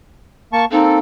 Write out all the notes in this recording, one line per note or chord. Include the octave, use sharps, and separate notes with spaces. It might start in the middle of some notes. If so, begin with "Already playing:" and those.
A#3 A5 C#6
A#3 C4 D#4 A4